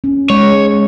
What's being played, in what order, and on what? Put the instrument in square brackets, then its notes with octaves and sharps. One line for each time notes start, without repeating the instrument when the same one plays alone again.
[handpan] C#4
[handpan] G#3 [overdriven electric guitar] C#5